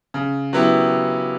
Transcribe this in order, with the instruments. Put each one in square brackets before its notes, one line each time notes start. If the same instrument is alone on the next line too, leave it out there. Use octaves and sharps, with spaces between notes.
[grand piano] C#3
F#3 B3 E4 G4